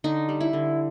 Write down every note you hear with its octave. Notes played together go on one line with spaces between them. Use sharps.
D3 D#4
G3
E4
D3